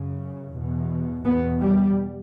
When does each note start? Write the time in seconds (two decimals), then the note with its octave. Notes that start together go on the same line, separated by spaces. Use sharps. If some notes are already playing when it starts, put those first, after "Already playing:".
Already playing: F#2 C#3
0.54 E2 B2
1.24 E2 B2 B3
1.61 G3